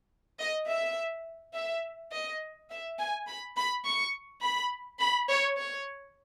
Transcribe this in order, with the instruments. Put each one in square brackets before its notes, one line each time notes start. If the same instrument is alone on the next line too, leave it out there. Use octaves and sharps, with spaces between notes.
[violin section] D#5
E5
E5
D#5
E5
G#5
B5
B5
C#6
B5
B5
C#5
C#5